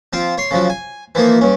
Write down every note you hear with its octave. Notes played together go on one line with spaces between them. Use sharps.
F3 C4 F4
C#5 C6
C#3 F3 F#3
G#5
E3 F3 A#3 D#4
G2 C#4